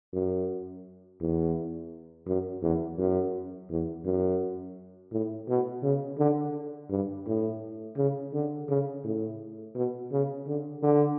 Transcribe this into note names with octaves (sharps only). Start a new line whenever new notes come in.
F#2
E2
F#2
E2
F#2
E2
F#2
A2
B2
C#3
D3
G2
A2
C#3
D3
C#3
A2
B2
C#3
D3
D3